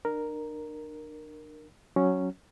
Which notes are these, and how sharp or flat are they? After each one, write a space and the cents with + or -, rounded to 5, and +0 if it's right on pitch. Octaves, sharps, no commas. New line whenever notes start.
D4 +40 A#4 +0
F#3 +0 C#4 +0